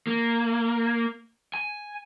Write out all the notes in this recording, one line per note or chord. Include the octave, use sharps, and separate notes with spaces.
A#3
G#5